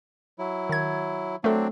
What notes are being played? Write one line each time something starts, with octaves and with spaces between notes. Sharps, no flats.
F#3 E4
D#3 G#6
F#3 A3 C4 D4 A4